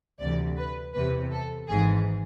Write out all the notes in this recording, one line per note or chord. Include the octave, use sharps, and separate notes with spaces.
D2 C3 E3 D5
B4
E2 C3 E3 B4
A4
G#1 G#2 E3 G#4